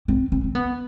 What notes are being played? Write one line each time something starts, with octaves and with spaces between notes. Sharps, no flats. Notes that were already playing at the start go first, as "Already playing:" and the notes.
C4
C4
C4
B3